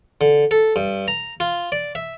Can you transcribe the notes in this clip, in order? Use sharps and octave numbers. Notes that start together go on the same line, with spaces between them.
D3
A4
G2
A#5
F4
D5
E5